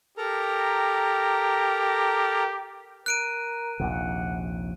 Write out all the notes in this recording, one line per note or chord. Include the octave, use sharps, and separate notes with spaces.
G4 A4 A#4 A#5
A#4 F#6 D7 D#7
A#1 D#2 C3 F#5